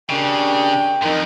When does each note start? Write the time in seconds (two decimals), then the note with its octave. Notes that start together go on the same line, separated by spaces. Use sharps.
0.10 D#2 C#3 D4 G5
1.03 F2 G#2 D#3 D#4